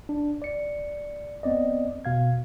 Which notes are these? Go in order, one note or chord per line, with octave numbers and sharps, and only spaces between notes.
D4
D5 C#7
B3 C4 D5 D#5
B2 F5 G#6